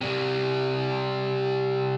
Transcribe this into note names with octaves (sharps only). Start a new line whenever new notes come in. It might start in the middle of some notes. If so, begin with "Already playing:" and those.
C3 G3